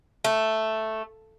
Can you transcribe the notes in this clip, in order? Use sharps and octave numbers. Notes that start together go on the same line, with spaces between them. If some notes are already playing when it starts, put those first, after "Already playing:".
A3